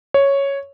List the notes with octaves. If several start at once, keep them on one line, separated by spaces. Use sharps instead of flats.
C#5